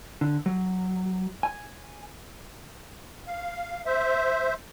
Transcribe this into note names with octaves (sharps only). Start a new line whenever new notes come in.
D3
F#3
G#5
F5
C5 E5